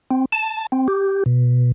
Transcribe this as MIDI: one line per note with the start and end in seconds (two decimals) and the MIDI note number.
0.11 0.25 60
0.32 0.67 81
0.72 0.88 60
0.88 1.23 67
1.26 1.72 47